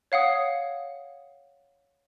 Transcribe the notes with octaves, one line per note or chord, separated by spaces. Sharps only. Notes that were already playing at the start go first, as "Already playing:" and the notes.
C#5 F5 F#5 D#6